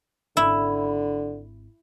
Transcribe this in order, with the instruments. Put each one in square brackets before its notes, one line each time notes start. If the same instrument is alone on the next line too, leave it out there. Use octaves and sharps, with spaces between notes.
[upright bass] G#1 [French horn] D3 [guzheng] E4